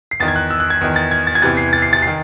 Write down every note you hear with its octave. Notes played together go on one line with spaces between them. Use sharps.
C7
E2 D#3 A6
G#6
F#6
E6
F#6
G#6
E2 D#3
A6
G#6
A6
G#6
E2 C3 E3 A6
C7
A6
C7
A6
C7
D#3